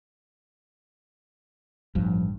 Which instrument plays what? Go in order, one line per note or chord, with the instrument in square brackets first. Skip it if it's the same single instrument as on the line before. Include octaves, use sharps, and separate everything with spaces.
[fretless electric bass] A1 G2 [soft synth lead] F3